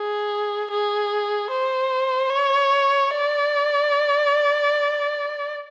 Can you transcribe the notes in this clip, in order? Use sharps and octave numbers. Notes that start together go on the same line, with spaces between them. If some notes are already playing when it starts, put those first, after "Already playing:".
Already playing: G#4
G#4
C5
C#5
D5